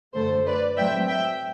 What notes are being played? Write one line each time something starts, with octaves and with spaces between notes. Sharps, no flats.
F#2 D3 A3 A4 C5
B4 D5
A2 F#3 C4 E5 G5
E5 G5